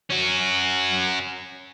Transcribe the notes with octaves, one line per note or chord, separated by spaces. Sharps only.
C#4 F#4